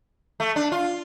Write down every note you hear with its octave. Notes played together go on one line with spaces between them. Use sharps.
A3
D4
F4